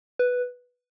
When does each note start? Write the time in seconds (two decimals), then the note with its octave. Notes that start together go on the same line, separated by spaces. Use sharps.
0.19 B4